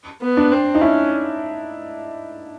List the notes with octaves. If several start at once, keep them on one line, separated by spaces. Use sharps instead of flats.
B3
D4
C4
D#4
C#4 E4